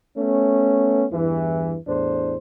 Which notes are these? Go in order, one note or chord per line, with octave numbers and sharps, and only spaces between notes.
A3 B3 C#4
E2 G2 E3
E2 A2 D4 C5